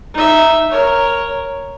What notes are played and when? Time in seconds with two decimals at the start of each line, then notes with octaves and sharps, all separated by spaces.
0.14 D#4 E5
0.71 A#4 C#5